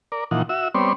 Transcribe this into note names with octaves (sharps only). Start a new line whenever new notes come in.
A#4 D5
A#2 E3 F3 D#4 F#5
F#4 E5 E6
G3 B3 C4 C#5 D5 C6